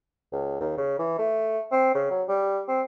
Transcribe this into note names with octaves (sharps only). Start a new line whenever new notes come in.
C#2
D#2
C#3
E3
A3
C4
C#3
F#3
G3
C4